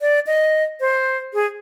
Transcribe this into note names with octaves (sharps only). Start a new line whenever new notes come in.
D5
D#5
C5
G#4